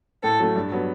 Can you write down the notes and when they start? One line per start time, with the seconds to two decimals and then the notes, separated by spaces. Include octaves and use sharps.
0.23 A2 A4
0.40 F#3 A3
0.56 G2
0.72 F#3 B3